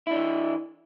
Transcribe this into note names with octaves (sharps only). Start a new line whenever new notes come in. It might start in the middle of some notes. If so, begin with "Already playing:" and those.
E3 D4 E4